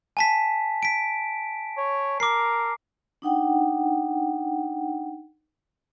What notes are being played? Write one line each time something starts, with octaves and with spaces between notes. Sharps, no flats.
G#5 A5 B6
B6 D7
C#5
A#4 D6 C7
D4 D#4 F#5 G5